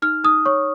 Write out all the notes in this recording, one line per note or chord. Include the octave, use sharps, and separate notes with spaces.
D#4 F6
D#4 D#6
C#5 C#6